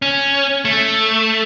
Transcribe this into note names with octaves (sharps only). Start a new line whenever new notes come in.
C#4
A3